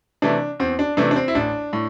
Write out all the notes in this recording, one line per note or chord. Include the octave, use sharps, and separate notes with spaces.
C3 E3 A3 D4
E2 C4
D4
C3 E3 A3 D4
D4
C4
E4
A1 D4
A2